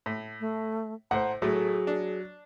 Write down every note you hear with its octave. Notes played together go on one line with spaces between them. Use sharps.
A2
A3
A2 C5 F#5 A#5
A2 F#3 A3 G#4
D4